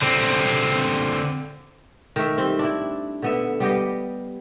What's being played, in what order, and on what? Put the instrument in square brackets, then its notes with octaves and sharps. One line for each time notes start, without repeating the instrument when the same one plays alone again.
[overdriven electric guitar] D3 C4
[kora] D#3 A3 E5
G3 C4
D4 E4
D3 B3 E5
G3 B3 G4 D#5